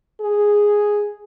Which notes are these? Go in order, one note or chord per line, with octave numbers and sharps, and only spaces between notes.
G#4